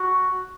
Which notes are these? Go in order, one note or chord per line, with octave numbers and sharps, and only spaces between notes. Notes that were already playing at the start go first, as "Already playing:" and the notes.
Already playing: F#4